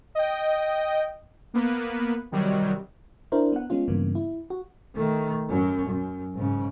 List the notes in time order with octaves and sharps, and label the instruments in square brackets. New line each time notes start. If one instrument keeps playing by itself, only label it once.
[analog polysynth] D#5 G5
A#3 B3 B4
C3 D#3 F#3 G3
[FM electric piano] D4 E4 A#4 C5
B3 F#5
G#3 B3 C#4 F4
G2 C#3 E3 A#3 B3
E4
F#4
[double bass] D#3 A3
F#2 F#3
F#2
G#2 C#3